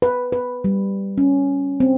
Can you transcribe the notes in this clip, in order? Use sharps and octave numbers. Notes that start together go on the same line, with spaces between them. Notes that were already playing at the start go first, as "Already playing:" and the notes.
B4
B4
G3
C#4
C4